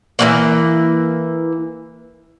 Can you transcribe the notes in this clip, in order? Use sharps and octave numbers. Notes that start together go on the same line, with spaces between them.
E3 G#3 A#3